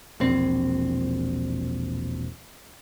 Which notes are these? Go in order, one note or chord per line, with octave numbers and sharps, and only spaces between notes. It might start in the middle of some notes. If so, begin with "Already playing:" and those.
E1 A#1 C4